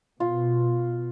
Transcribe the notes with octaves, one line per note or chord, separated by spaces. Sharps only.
B2 F4